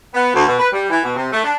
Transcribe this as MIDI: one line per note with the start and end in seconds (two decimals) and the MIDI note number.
0.14 0.34 59
0.34 0.46 38
0.47 0.58 47
0.59 0.68 71
0.72 0.86 55
0.90 0.99 52
1.03 1.16 47
1.16 1.28 48
1.32 1.40 57
1.44 1.54 62